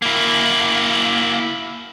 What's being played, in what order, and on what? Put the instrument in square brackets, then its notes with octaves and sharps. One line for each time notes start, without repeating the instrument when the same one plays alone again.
[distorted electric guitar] A#3 E4